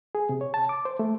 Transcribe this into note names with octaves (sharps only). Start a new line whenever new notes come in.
G#4
C3
C#5
A5
D6
C5
A3